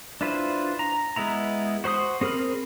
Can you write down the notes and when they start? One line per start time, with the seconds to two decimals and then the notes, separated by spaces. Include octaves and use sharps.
0.21 D4 E4 F4 B4 C5
0.79 A#5
1.16 G#3 B3 E4 A#5
1.84 F#4 C5 B5 D#6
2.21 C4 G#4 A#4 B5 F6